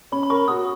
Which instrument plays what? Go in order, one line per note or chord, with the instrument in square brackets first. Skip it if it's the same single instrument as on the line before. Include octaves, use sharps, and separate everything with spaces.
[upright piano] C#4 [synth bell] B5
[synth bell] B5
[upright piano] A#4 [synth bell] C#6
[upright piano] F#4 [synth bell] D#6